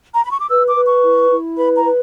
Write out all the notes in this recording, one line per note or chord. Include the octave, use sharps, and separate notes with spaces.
A#5
B5
C#6
D6
B4 E6
D6
B4
C#6
E4
E4
B4 B5
A#5
B4